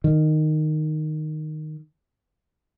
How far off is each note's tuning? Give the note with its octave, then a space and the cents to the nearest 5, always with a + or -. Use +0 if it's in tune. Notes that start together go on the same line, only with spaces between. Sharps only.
D#3 -10